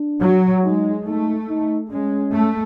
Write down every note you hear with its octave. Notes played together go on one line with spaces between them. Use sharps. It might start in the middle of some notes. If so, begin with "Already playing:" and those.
Already playing: D4
F#3
G#3 D#4
A3 D#4
D#4
G#3 C#4
A3